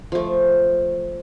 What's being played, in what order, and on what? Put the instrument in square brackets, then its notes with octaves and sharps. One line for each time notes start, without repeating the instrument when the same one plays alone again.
[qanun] F3 A3